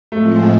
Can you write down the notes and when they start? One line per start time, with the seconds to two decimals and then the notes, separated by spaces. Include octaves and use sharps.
0.12 A2 F3 G#3 A3 C4 F4